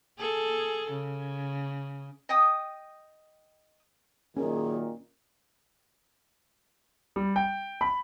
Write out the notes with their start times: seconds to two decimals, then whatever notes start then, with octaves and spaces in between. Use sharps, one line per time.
0.18 G#4 A4
0.92 C#3
2.29 D#5 G5 D#6
4.37 F#2 A#2 D#3 C#4 G#4
7.16 G3
7.36 G5
7.81 B5